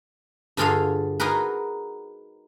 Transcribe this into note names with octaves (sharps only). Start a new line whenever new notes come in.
G2 D3 F4 G#4 A4 F5
D#4 F#4 G#4 A#4 B4